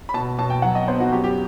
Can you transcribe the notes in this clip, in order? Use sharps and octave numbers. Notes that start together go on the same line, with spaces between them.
B5
B2 A5
B2 A5
G5
F#3 F#5
D#5
B3 C5
F#4
F#2 G4
G4